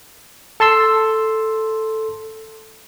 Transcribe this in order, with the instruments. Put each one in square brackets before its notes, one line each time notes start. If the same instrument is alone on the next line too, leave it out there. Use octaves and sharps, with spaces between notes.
[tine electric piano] A4 A5 C6 E6